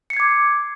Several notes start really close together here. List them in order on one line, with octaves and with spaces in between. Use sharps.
C#7 C7 G#6 D6